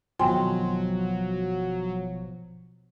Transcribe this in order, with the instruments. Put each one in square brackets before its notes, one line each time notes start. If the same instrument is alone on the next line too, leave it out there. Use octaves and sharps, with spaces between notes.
[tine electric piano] G#1 B2 F3 [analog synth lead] F#3 [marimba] G5 G#5 C6